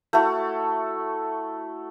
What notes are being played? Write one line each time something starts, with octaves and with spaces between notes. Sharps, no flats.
A3 E4 F#4 A4